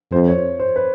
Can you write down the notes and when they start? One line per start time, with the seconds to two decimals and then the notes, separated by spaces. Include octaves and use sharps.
0.12 F2 C5
0.28 C#5
0.60 C5
0.76 B4